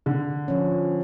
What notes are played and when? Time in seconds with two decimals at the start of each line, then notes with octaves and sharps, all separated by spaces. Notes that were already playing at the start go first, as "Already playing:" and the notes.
0.06 D3
0.48 F3 C#4